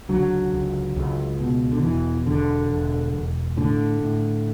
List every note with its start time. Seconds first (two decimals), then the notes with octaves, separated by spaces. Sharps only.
0.09 C#2 D3 F#3
0.52 C#2
0.96 C#2
1.40 B2
1.72 D3
1.83 E1 E3
2.26 E1 D3
2.70 E1
3.14 E1
3.57 A2 D3
4.00 A2